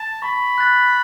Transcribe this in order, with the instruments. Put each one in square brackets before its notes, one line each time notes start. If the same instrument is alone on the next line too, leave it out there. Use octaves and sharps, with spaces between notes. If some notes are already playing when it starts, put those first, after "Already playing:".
Already playing: [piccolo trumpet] A5
[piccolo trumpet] B5 [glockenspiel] C#6
[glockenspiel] F#6 A6